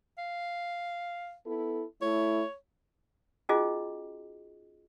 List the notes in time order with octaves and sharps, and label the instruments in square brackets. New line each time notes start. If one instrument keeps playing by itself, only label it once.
[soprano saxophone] F5
[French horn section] B3 E4 A4
[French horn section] A3 E4 [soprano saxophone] C#5
[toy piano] C#4 D#4 F4 F#4 G#4 D#5